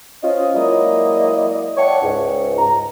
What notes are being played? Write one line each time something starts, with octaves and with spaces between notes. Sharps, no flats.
C#4 F4 C5 D#5
F#3 G#3 A#3 E4 D5 D#5
D5 E5 F#5 G5 A5 C#6
C#2 G#2
A#5